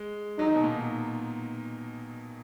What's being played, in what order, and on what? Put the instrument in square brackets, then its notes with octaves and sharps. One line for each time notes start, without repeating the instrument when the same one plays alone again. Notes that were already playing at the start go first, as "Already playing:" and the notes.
Already playing: [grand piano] G#3
[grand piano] F#3 [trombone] D#4
[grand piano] D#3
B2
A#2